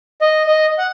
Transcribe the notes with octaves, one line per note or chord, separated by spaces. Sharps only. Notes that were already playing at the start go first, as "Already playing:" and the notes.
D#5
D#5
F#5